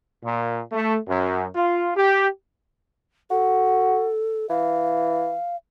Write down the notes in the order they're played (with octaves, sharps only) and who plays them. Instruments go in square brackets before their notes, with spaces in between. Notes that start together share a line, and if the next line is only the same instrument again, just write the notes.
[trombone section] A#2
A3
F#2
F4
G4
[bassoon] F#4 [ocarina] A4
[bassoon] E3 [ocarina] F5